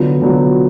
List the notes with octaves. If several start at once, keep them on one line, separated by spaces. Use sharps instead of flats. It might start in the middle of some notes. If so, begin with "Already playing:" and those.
Already playing: D3 F#3 B3 F4
D3 F#3 B3 F4